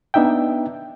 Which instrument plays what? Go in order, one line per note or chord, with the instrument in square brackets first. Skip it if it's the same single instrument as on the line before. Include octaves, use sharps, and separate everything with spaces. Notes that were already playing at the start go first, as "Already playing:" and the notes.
[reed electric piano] B3 D4 D#4 E5 G5